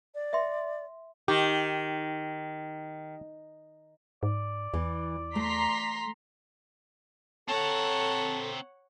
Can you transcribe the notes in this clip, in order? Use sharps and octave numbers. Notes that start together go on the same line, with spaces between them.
D5
E5 G5 C6
D#3 G4
G#2 D5
E2 E3
A3 A#5 C6 B6
C4 A4 C#5 F#5 A5 A#5